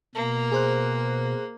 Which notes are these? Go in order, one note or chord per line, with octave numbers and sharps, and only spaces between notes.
B2 A#3
G#4 C5 F#6